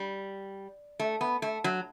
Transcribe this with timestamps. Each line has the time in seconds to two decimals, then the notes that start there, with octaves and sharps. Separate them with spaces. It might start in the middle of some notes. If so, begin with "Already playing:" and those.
Already playing: G3
0.99 A3
1.21 B3
1.42 A3
1.64 F#3